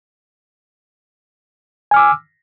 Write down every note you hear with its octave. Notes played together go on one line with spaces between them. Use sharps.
G#5 D6 E6 F6